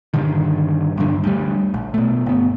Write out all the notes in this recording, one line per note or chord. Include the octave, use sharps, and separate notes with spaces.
G2 A#2 D3 D#3
D#1 A#1 G2 D3
D2 G3
A#1
B2 A3
G1 B3